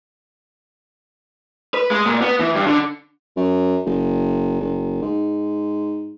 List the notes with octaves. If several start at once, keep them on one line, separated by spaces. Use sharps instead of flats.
B4
G#3
A#2
B3
E3
G2
D3
F#2
F#1
F#1
G#2